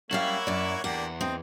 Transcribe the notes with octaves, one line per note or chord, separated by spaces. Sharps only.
F#2 G3 A#3 E4 C#5 F5 F#5
F#2 D5
E2 A#3 D4 G4 F#5
C4 D#5